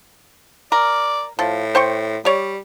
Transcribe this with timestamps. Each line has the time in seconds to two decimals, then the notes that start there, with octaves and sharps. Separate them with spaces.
0.72 A#4 D5
1.39 A2 F3
1.75 C5 G5 C#6
2.25 G3 C#5 D5